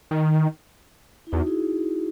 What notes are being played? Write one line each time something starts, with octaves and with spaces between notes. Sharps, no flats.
D#3
E4
E2 D#4 F#4
E4 G#4